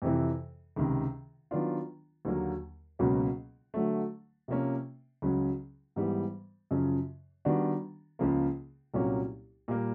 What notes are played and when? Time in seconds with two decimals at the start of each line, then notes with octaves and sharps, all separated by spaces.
0.02 F2 C3 E3
0.76 C#2 C3 D#3
1.51 D#3 F#3 B3 D4 F4
2.25 D#2 D3 F#3 A#3
2.99 C#2 B2 F#3 A#3 C#4
3.74 D3 F#3 A3
4.48 C3 F3 A#3 C#4
5.22 C#2 C#3 F#3
5.96 G#2 E3 G3 B3
6.71 F#2 C#3 F3
7.45 D#3 G3 B3 D4 F#4
8.19 C#2 C#3 F3 A#3
8.94 C2 A#2 F#3 A#3 C#4
9.68 A#2 G3 A#3